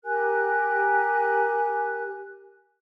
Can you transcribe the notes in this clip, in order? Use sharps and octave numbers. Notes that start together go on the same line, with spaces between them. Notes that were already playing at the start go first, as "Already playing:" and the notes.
G4 A#4 G#5 F#6